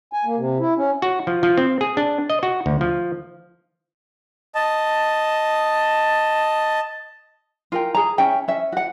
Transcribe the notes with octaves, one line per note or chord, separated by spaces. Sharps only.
G#5
A#3
C3
E4
C#4
F#4
F3
F3
C4
G#4
D4
D#5
F#4
D2
F3
D#5 A5
F4 A#4 G5
G#4 A#5
C#4 E5 G5
C#4 E5
F#4 F#5